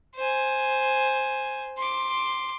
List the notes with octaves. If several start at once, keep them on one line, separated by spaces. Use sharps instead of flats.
C5 G#5
C6 D6